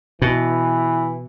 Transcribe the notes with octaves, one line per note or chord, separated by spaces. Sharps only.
B2 E3